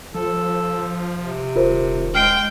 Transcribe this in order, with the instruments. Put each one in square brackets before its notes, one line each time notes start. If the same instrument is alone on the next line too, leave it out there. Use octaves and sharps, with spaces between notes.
[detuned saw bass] F3 [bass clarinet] A4
[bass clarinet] C3
[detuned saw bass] D#1 [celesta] F4 A#4 C5
[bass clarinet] G#3 [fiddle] G5 [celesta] F6 C7 D7